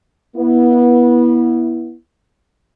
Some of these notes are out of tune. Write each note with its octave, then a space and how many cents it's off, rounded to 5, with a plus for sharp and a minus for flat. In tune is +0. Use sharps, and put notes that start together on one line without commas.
B3 -25 E4 -5